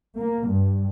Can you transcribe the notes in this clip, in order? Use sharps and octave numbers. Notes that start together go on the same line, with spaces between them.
A#3
G2